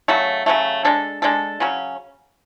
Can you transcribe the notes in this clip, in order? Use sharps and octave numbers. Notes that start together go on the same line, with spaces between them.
C#3 F#3 A3
C#3 F#3 A3
G#3 D4 A4
G#3 D4 A4
C#3 F#3 C#4